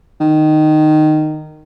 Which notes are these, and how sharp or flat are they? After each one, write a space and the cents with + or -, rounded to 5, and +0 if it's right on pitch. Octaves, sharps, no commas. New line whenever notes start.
D#3 -15